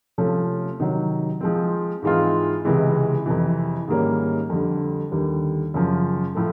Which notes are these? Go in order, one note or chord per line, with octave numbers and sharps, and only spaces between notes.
C3 F3 A3 C#4
C3 D#3 F#3
F3 G#3 C4
G#2 E3 G#3 C4 F4
C#2 C3 E3 G#3
F2 C3 E3
G#2 D#3 G3 A#3 C#4
F2 D3 G3
D#2 D3 G3
F#2 C#3 F3
A2 F3 A3